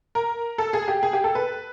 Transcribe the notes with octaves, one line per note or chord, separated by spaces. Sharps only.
A#4
A4
G#4
G4
G#4
G4
A4
B4